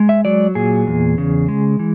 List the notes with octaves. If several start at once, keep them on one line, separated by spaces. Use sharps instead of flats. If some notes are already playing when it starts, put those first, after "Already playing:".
Already playing: G#3
E5
F#3 D5
A#2 G#4
E2
C#3
G#3
E3